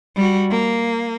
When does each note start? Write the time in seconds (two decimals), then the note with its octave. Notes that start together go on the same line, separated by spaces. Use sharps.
0.16 G3 F#4
0.50 A#3